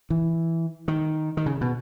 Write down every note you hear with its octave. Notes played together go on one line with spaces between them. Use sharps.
E3
D#3
D#3
C#3
B2